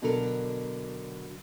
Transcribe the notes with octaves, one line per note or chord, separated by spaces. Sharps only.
B2 D3 F#3 B3 A4 A#4